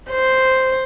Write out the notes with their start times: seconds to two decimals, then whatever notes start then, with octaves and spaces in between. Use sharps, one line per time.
0.11 C5